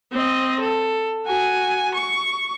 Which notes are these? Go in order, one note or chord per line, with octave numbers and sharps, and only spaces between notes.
C4 D#5
A4
F#4 G#5
C#6